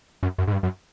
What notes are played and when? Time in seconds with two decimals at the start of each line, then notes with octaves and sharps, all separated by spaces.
0.23 F#2
0.38 F#2
0.47 G#2
0.53 G2
0.63 F#2